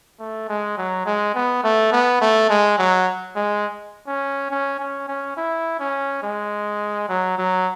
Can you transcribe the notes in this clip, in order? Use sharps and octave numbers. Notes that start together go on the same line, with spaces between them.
A3
G#3
F#3
G#3
B3
A3
B3
A3
G#3
F#3
G#3
C#4
C#4
C#4
C#4
E4
C#4
G#3
F#3
F#3